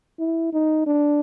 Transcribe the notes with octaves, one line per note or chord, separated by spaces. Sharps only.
E4
D#4
D4